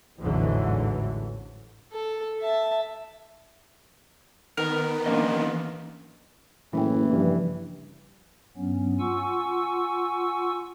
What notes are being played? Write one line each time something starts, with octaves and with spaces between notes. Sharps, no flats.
A1 E2 G#2 D3 E3 F#3
A4
E5 A5
D#3 B3 A#4
E3 A#3 C#4 D4 D#5
F#1 A2 E3 A#3 G5
G2 C#3 F3
G2 F#3 B3 C#4
F4 F#5 G#5 C#6 E6